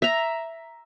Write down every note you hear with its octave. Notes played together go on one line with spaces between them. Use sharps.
E5 A#5